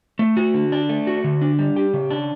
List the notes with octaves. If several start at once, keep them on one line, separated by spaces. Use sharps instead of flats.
A3
F#4
D3
D4
A3
F#4
D3
D4
G3
G4
C#3
D4